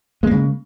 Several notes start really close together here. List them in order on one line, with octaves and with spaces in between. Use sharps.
G#3 A#3 C#3